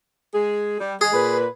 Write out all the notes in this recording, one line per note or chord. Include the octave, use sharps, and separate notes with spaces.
G#3 G#4
G3
G#3 G#4
A#2 B4